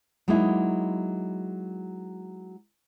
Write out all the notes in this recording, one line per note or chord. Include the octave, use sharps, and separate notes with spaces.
F#3 G#3 A#3 D#4 E4